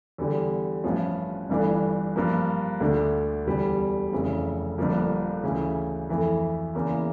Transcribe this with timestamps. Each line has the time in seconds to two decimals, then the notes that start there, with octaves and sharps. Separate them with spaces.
0.18 E2 D3 G3
0.84 A1 G2 F3 C#4
1.49 G1 G2 E3 A3 D4
2.16 G2 F3 A#3
2.80 D2 D3 A3 D4
3.46 E1 E2 D3 G3
4.12 F1 F2 C#3 E3
4.78 G1 G2 D3 F3 A#3
5.44 D2 C#3 E3
6.09 F2 E3 A3
6.75 E2 C#3 E3 A#3